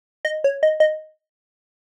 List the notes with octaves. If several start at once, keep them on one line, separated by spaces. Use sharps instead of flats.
D#5
C#5
D#5
D#5